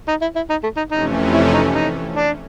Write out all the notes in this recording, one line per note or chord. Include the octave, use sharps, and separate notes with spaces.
D#4
E4
E4
D#4
A3
D#4
F2 C3 E3 A3 C#4 D#4
E4
D#4
D#4
D4